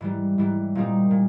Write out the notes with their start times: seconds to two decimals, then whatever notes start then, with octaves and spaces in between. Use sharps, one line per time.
0.01 G#2 E3 G3
0.38 G#2 E3 G3
0.75 A#2 G3 C4 D#4
1.11 A#2